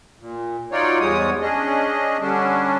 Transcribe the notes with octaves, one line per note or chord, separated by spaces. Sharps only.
A#2
F#3 D#4 F4 C#5 D5
E2 G#2 G3 G#3 C#5 D#6
C#4 D4 G#4 D#5
D3 G3 C#4 D4